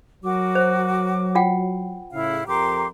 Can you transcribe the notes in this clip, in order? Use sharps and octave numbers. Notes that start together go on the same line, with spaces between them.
F#3 F#4 A#4 D6
C5
F4 F#5 G5
A2 C#3 E4 F5
F2 G4 A#4 A#5 C6 D6